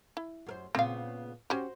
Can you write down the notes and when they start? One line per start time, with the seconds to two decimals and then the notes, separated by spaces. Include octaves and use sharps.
0.17 E4
0.46 F#2 A#4 C5
0.75 A#2 C#3 B3 C4 F5
1.50 C#4 F#4 G4 C5